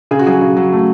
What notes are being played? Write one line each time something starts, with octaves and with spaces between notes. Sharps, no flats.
C#3 G#4
F#4
F#3 G#4
C#3
F#3
A3